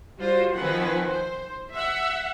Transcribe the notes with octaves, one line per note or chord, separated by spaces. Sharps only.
G3 F4 F#4 C5
D#3 F3 C4 B4 F#5 G#5
C5
E5 F#5